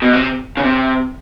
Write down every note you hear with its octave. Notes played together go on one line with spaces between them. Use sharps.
B2
C3
C#3
C3